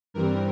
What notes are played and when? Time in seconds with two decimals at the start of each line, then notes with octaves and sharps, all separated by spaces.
0.14 G2 E3 G3 C4 A#4